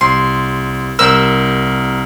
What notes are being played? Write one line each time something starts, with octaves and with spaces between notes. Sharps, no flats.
C2 C6
C2 A#4 E6 G6